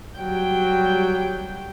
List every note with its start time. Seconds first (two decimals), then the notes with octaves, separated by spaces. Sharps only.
0.17 F#3 G3 G5